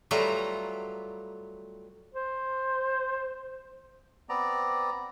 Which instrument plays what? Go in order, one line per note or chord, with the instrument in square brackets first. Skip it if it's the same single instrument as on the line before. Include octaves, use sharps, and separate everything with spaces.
[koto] F#3 G3 A3 F4 B4 A#5
[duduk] C5
[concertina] B3 C4 D5 A#5